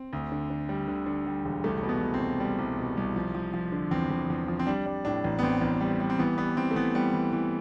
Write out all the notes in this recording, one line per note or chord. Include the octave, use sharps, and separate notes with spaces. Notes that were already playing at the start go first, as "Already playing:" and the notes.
Already playing: C4
D2
D3
D3
G3
D3
D3
G3
E1
C2 A3
B2
B3
C2
C4
B2
G3
C2
B2
C2
F3
F3
F3
D3
E2 C4
E2
E2
F3
C4
G3 D4
G3
A2 D4
A1
B3
A1 C4
A1
G3
G3
C4
E3 B3
G3 B3
E3 C4
A3
E3 B3
G3 B3
E3
E3